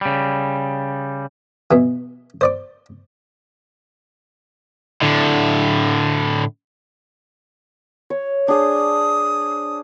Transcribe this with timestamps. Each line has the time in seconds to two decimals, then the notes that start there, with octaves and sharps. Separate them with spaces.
0.01 C#3 G3
1.71 B2 E3
2.41 C5 D5 D6
5.02 A2 D3
8.10 C#5
8.48 D4 G#4 C5 D#6